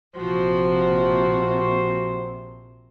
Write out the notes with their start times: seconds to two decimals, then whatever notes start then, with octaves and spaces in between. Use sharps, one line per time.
0.16 A#1 C3 F3 F#4 C5